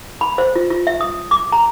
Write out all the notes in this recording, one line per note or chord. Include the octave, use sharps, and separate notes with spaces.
B5
C5
F4
F4
E5
D#6
D6
A#5